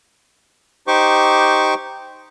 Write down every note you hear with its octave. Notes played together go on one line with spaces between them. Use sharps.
D#4 G4 C5 C#6 D6